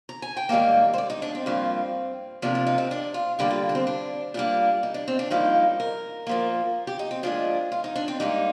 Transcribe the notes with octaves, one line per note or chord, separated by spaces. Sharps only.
A#5
G#5
G5
G#2 D#3 G3 A#3 F5
C5
D5
D#4
D4
C4
G2 F3 A#3
C3 F3 A#3 D4
D4
D#4
C4
D4
F4
G2 D3 G3 A#3 G4
F4
D4
C4
D4
A#2 G3 A#3 D4
D#4
D4
C4
D4
G2 F3 A#3 D#4
A#4
A#2 F3 A#3
G4
D#4
C4
A#2 F3 G#3 D4
F4
D#4
D4
C4
G#2 G3 A#3 D#4